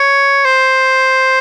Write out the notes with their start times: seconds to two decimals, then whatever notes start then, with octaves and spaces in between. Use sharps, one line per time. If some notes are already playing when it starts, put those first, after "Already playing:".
Already playing: C#5
0.45 C5